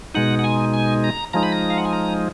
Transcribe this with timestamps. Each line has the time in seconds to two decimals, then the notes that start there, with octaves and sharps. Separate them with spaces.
0.14 B2 G#3 D#4 F#5
0.39 F#5
0.44 G#5
0.73 G#5
1.04 A#5
1.33 F3 G#3 D#4 A#5
1.43 B5
1.52 A#5
1.70 F5
1.78 F#5
1.85 G#5
1.93 A#5